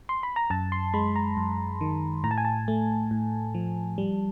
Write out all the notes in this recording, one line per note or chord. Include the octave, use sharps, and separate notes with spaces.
C6
B5
A#5
F#2 A5
C6
G#3 B5
A#5
F#2
D#3
A2 A#5
A5
G#5
A5
A3
A2
F3
G3